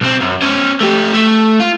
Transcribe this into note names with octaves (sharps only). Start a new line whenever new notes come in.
B1 C4
F#2
C#4 C5
A3 G4
A3
F4